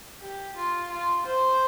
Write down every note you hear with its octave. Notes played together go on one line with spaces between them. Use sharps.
G4
F4
F4
C5